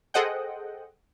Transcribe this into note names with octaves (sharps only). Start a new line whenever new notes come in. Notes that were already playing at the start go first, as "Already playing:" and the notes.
G#4 A4 C5 D#5 F#5 G5